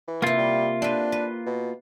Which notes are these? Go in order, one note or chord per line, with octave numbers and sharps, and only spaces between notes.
E3
C3 A#3 E4 F4
G3
C4 D4 B4
B4
B2